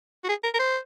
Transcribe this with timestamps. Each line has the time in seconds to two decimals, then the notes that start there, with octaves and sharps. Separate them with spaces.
0.24 F#4
0.29 G#4
0.44 A#4
0.54 A#4
0.59 C5